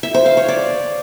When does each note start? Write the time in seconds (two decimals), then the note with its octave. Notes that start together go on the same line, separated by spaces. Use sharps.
0.03 E5
0.14 C5
0.26 F5
0.37 C#5
0.48 D5